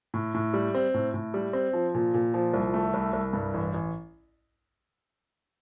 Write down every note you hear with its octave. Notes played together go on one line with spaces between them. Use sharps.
A2
A2
G3
C4
A2
A2
G3
C4
F3
A#2
A#2
F3
C2
A3
C2
C2
G2
A1
A1